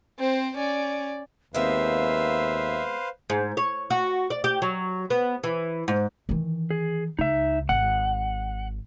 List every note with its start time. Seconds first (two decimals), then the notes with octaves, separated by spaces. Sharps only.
0.20 C4 C5
0.57 C#4 D5
1.54 D#2 G#3 B3 C4 B4 C5 E5 F5
3.30 G#2
3.57 C#5
3.90 F#4
4.30 D5
4.44 G4
4.62 F#3
5.10 B3
5.44 E3
5.88 G#2
6.29 D#3 E3
6.71 G#4
7.19 C#2 D#4 E5
7.69 G#1 F#5